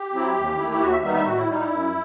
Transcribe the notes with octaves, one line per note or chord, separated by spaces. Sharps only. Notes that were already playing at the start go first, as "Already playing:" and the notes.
Already playing: G4
F#3 C4 E4
D#2
D#3 A3 E4
E4
D#2 F#4
E5
D#3 G3 B3 D#4 E5
E5
A2 F#4
E4
G3 D#4
E4
F#2